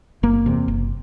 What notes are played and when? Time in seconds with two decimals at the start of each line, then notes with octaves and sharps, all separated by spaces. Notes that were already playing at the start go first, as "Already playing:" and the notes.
0.23 F#1 A#3
0.46 E2 C3
0.68 F#1